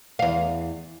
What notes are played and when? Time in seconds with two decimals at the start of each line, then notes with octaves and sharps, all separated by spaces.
0.19 E2 F5